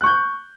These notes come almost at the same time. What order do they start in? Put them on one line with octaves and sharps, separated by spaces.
F#6 C#6 G6